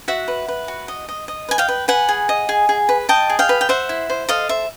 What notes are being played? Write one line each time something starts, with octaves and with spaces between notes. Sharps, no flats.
F#4 E5 F#5
B4
B4
F#4
D#5
D#5
D#5
B4 G#5
F5 G5
B4
B4 F#5 G#5
G#4
D#5
G#4
G#4
B4
D#5 G5 A5
G#4
F5 G5
B4
G5
C5 E5 F#5
E4
C5
A4 D#5 F5
C5 E5